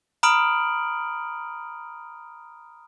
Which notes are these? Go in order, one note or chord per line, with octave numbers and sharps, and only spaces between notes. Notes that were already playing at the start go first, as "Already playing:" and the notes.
A#5 B5 D#6 F6 D7 F#7